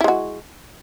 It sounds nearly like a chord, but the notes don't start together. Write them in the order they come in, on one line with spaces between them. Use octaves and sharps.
E4 G#3 F#4